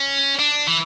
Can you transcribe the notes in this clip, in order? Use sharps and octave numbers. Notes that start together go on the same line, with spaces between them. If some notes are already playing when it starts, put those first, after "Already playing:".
Already playing: C#4
D4
E3